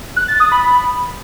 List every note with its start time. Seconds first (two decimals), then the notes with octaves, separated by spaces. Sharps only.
0.16 F#6
0.28 A6
0.40 D#6
0.52 B5